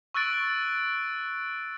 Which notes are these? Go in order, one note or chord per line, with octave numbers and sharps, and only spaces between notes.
C#6 E6 F#6 A6 D7